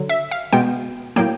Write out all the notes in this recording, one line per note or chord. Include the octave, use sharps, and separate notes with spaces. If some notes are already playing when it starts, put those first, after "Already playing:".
Already playing: D3 F#3
E5
F5
B2 G#3 B3 G5
A2 F#3 A#3 G5